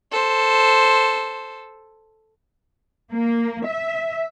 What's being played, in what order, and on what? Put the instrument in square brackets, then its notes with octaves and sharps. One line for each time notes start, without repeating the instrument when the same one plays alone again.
[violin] A4 C5
[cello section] A#3
E5